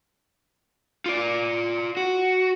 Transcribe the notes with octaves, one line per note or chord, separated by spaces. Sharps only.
F4 D5
F#4